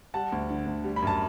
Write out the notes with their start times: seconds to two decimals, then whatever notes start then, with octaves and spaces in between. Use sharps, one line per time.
0.14 G3 F#5 A5
0.32 D2
0.50 D3
0.67 D2
0.84 G3
0.96 B5
1.02 F#2 A5